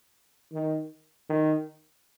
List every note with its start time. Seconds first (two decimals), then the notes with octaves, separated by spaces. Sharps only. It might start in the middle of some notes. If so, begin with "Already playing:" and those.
0.52 D#3
1.30 D#3